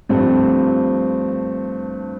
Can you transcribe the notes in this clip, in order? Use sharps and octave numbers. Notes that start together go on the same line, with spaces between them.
G2 F3 A3 C4